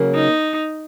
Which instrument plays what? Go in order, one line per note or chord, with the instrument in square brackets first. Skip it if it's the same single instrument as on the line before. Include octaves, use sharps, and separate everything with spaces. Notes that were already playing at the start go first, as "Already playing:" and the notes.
Already playing: [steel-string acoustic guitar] C#3 F#3 A#3
[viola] D#4